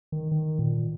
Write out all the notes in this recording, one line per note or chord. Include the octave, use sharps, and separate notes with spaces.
D#3
D#3
A#2